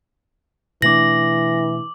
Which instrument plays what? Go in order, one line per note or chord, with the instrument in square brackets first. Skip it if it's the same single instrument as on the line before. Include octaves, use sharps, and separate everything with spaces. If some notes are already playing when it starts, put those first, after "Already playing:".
[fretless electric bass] B2 A3 D4 [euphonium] E3 [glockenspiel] D6 F#7 [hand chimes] A#6